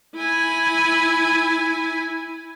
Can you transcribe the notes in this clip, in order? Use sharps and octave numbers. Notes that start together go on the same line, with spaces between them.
E4 G#5